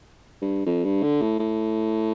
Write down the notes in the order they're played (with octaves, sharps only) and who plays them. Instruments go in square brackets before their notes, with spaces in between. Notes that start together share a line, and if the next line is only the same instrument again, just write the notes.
[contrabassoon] G2
F2
G2
D3
A2
A2